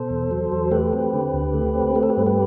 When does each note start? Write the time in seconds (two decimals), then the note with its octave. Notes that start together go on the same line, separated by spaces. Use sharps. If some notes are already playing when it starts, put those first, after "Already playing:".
Already playing: B2 A4 C5
0.10 E2
0.31 F#3
0.52 E2
0.71 A3 G4 B4
0.93 C4
1.14 D3
1.33 D2
1.54 A3
1.75 C4
1.95 A3 B4
2.03 A4
2.10 G4 B4
2.17 G2
2.27 G4 B4